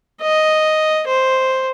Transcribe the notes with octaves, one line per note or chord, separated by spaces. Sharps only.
D#5
C5